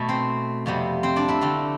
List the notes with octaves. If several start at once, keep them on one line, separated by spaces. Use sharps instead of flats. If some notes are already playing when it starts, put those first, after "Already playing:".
Already playing: B2 A3
C4 C5
F2 C3 G3 B3
C4 C5
D4 D5
E4 E5
D3 A3 C4